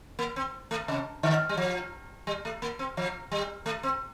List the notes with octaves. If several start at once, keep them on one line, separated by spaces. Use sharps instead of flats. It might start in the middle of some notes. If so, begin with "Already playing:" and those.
A#3
C4
A3
C3
D3
G3
F3
G3
A3
A#3
C4
F3
G3
A3
C4